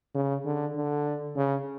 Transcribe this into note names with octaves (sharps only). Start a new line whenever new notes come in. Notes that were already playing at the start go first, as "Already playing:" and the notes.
C#3
D3
D3
C#3